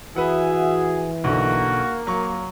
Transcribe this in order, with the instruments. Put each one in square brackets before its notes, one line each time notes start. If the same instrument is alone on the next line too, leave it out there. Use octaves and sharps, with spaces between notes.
[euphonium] E3 [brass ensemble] F#4 G#4 [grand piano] B4 F#5 [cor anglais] E5
[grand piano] B1 D3 [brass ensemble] A#3 [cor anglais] F#4
[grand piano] F#3 C#6